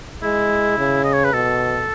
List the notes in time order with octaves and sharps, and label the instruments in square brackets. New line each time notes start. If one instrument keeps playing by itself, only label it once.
[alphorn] G#3 [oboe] E4
[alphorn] C#3
[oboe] D#5
C#5
B4
[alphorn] B2 [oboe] A4